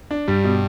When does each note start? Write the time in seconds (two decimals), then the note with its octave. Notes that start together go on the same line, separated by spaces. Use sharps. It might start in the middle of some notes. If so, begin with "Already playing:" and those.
0.11 D4
0.28 G2 G3
0.44 B2